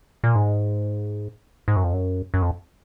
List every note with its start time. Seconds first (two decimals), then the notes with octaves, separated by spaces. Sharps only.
0.24 A#2
0.35 G#2
1.68 G#2
1.76 F#2
1.84 F2
1.93 F#2
2.34 F#2
2.42 F2